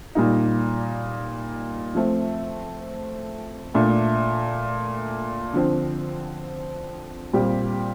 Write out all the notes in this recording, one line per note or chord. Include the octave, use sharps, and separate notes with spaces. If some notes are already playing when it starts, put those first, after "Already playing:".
A#2 G3 A#3 D#4
F3 A3 C4
A#2 A3 D4
D3 F3 C4
A#2 G3 C4 G4